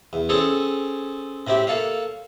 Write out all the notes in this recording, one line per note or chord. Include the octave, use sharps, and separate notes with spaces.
E2
C4 C#4 G#4 A4 C#5
A2 C4 E4 G4
A#3 A4 C#5 F5